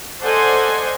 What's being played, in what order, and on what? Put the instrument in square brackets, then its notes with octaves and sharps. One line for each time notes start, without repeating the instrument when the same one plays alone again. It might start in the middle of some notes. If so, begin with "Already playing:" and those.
[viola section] A4 C5 D5 D#5 F#5 G#5